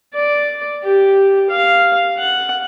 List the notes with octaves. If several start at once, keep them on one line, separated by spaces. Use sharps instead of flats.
D5
G4
F5
F#5